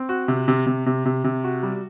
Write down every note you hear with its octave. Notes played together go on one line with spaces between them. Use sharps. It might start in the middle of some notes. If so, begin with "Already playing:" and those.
Already playing: C4
F#4
C3
C3
C3
C3
C3
C3
F#4
G3